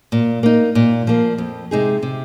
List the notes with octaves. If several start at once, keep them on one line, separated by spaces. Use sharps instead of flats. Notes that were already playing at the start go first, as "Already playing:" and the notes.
A#2
A#3 D#4
A#2
F3 A#3
F2
C3 G#3 D#4 G#4
C3